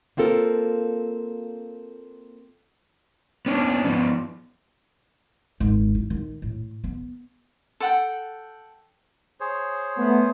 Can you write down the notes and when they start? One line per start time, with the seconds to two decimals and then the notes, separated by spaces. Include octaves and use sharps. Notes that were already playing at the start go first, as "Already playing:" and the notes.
0.17 A#3 C4 F4 A4 A#4
3.46 B3 C#4 D4
3.85 F3 B3
5.60 G#1
5.95 E4
6.10 D#3
6.42 A2
6.84 B3
7.80 A4 F#5 G5
9.40 G#4 C5 C#5
9.99 A3 B3